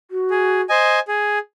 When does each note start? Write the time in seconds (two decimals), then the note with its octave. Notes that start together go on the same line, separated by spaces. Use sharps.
0.11 F#4
0.30 G#4
0.69 C5 D#5 G#5
1.08 G#4